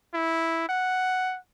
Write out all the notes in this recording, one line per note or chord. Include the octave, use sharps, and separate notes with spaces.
E4
F#5